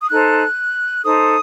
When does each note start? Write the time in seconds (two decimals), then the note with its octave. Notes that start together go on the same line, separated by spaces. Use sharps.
0.01 D#6
0.10 D#4 A4 C5 F#6
1.03 D#4 A4 C5 D#6